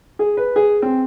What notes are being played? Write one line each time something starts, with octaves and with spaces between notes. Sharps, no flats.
G#4
B4
G#4
C4